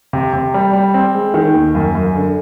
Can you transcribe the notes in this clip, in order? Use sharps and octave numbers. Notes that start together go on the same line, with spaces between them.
C3
C3
G3
G3
C4
G#3
D#3
D#2
F#2
F#2
D3